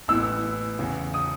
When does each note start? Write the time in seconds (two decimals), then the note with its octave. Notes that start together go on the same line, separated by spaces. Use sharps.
0.08 A1 A2 E3 B3 E6
0.79 E2 C#3 E3
1.14 D#6